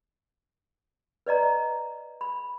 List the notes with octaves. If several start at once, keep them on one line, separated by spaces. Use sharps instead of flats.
B4 D5 D#5 A#5
B5